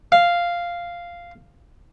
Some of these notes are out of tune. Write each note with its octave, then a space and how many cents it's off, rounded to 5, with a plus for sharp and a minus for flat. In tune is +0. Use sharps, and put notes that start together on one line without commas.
F5 -5